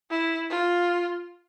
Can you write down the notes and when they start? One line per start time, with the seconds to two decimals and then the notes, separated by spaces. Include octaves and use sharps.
0.10 E4
0.50 F4